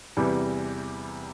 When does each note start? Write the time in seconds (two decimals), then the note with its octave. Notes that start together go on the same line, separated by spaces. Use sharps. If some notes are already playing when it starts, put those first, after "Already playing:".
0.17 E2 C3 E3 G3